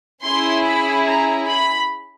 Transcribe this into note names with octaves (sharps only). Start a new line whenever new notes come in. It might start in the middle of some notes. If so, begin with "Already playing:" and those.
C#4 E4 G#4 C6
B5
A#5
B5